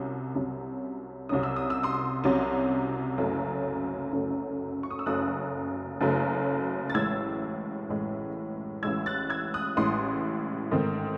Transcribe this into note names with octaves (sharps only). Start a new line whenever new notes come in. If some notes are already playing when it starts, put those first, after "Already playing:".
Already playing: C2 C3 F#3 C#4
C2 C3 F#3 C#4
C2 C3 F#3 C#4 D#6
E6
D#6
E6
C6 D#6
C2 C3 F#3 C#4
F#1 F#2 C#3 F#3 A3
F#1 F#2 C#3 F#3 A3
C#6
D#6
E6
F#1 F#2 C#3 F#3 A3 D#6 F#6
F#1 F#2 C#3 F#3 A3
A6
A1 A2 G#3 E6 G#6
A1 A2 G#3
A1 A2 G#3 E6 G#6
F#6 A6
E6 G#6
D#6 F#6
A1 A2 G#3 C6 D#6
G#2 D#3 A3 C4